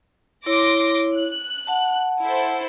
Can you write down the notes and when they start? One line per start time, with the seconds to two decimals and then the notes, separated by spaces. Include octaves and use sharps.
0.46 E4 C#5 C6 D6 A#6
1.18 F#6
1.67 F#5 A5
2.22 E4 A4 C5